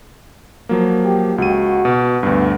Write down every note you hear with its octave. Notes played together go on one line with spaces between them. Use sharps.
F3 F#3 A#3
G4
C#2 F#4 D#7
B2
D2 G2 B3